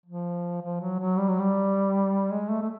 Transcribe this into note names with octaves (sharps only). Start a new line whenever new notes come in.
F3
F3
F#3
F#3
G3
F#3
G3
G#3
A3
A3